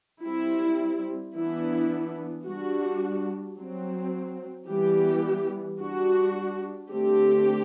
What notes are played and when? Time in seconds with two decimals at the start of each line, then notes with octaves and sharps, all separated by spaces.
0.24 G3 C4 E4
1.35 E3 B3 D4 E4
2.46 G3 D4 F#4
3.57 F#3 C4
4.69 E3 G3 B3 G4
5.79 G3 D4 F#4
6.91 D3 A3 C4 G4